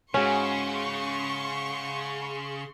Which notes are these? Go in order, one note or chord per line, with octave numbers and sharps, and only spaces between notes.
G#2 C#3 C#4 F#4 G#4 C6 C#6